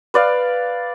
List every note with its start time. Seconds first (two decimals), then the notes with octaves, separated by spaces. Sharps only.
0.14 B4 D5 F5